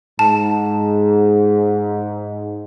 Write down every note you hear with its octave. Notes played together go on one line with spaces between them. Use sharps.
G#2 A5